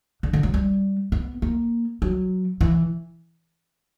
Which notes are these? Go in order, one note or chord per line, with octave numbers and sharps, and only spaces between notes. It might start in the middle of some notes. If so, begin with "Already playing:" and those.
D3
D3
F#3
G3
B3
A#3
F#3
E3